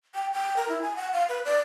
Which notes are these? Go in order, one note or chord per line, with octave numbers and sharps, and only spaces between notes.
G5
G5
A#4
E4
G#5
F#5
F5
B4
D5